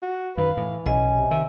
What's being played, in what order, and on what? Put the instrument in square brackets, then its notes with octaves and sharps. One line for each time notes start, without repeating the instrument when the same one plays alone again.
[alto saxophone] F#4
[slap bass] F#2 D#3 [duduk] B4 [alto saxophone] F5
[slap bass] A2 [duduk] E3
[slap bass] B1 [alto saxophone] C#4 [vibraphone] D#5 G#5
[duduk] C3
[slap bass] D#3 [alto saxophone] E5